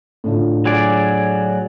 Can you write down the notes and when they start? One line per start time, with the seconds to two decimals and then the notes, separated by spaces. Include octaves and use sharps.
0.24 A2 D3 F4
0.66 F#3 G#4 D5